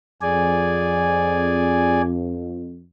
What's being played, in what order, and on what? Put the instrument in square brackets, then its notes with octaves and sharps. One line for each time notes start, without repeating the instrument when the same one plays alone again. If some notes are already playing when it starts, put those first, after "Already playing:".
[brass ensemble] F2 [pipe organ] G#4 D5 G#5